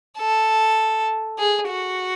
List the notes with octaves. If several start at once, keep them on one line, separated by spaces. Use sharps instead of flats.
A4
G#4
F#4